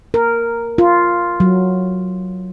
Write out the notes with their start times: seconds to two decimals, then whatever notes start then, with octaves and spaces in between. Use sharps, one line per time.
0.14 A#4
0.78 F4
1.40 F#3